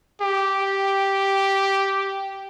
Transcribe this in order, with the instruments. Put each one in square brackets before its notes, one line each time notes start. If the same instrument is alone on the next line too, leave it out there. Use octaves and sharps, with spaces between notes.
[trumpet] G4